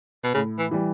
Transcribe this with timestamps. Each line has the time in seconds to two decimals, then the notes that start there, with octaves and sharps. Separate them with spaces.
0.24 B2
0.34 A2 C#3
0.59 E3
0.71 E3 G3